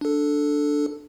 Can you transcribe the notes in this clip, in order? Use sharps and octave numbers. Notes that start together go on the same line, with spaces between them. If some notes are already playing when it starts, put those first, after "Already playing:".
D4 A4